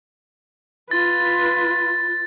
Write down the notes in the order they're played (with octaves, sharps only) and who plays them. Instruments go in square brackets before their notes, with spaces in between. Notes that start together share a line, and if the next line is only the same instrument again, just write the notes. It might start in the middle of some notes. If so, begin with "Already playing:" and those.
[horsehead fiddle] F4 B4 [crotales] A6